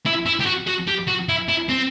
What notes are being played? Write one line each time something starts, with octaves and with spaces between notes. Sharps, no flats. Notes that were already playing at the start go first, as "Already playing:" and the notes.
E4
E4
G4
F#4
F#4
G4
F#4
E4
E4
C4